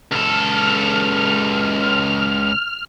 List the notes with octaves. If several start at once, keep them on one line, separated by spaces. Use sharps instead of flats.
C#2 A4 F6